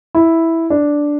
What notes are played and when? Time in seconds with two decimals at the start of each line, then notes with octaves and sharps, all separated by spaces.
0.15 E4
0.70 D4